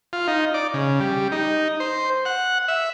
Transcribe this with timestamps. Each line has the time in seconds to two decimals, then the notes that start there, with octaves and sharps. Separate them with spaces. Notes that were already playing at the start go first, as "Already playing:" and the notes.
0.13 F4
0.28 D#4
0.54 D5
0.74 C#3
1.00 G3
1.32 D#4
1.80 C5
2.25 F#5
2.68 E5